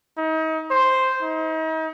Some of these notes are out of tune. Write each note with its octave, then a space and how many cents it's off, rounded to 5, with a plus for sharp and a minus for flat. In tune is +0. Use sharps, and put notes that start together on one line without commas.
D#4 +35
C5 +0
D#4 +40